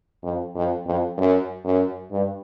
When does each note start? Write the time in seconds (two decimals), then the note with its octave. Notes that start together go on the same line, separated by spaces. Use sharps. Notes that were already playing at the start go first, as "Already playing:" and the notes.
0.23 F2
0.55 F2
0.86 F2
1.18 F#2
1.65 F#2
2.12 G2